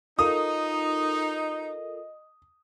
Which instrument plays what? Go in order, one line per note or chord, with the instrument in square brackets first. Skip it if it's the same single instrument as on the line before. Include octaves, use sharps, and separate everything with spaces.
[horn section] D#4 [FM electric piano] F4 A4 A#4 [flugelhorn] D#5 [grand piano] D#6